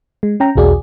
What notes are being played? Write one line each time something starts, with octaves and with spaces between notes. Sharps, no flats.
G#3
C#4 G5 A#5
B1 E2 F#4 G#4 D5